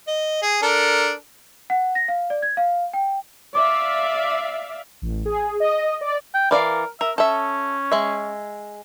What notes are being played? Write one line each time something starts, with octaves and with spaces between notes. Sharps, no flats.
D#5
G#4
D4 A4 A#4
F#5
A#6
F5
D5
G#6
F5
G5
D5 E5 F5 D6
A1
G#4
D#5
D5
G5
E3 A#4 D5 F5
A#4 E5
C#4 A4 E5
G#3 E5